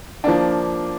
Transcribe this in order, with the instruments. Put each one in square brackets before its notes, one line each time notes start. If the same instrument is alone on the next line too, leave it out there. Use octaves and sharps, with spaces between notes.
[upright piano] F3 A#3 D4